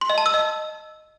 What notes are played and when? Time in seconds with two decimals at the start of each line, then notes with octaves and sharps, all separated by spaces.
0.01 C6
0.10 D#5
0.18 A5
0.26 E6
0.34 D#5